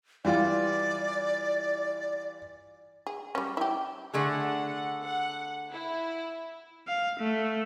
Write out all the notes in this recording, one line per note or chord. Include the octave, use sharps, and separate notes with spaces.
E3 G3 F4 D5
G#4
G3 C#4
E4 G4
D3 A3 G#4 F#5
F#5
E4
F5
A3